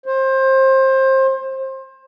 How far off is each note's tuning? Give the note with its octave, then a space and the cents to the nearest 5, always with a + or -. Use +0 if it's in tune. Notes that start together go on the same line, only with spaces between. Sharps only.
C5 +25